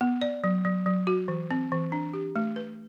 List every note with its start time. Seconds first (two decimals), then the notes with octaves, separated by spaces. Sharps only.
0.01 B3
0.21 D5
0.44 F#3
0.65 F#3
0.86 F#3
1.07 F#4
1.28 E3
1.51 C4
1.72 E3
1.92 D4
2.14 G4
2.36 A3
2.56 B4